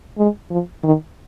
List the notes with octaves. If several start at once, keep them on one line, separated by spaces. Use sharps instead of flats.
G#3
F3
D#3